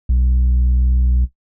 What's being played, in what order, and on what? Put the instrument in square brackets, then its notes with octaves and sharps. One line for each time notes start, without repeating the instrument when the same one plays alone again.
[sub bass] B1